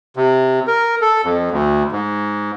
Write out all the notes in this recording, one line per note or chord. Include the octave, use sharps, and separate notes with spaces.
C3
A#4
A4
F2
D2
G#2